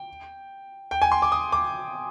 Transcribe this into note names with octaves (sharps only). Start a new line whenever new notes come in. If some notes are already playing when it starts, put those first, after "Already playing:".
Already playing: G5
G5
G#5
C6
D6
D#6
D6